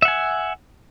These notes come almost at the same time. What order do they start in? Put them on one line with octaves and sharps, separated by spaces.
E5 F#5 G#5